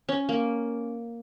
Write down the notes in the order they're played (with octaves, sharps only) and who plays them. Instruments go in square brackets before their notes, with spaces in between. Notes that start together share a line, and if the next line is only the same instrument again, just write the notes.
[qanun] C#4
A#3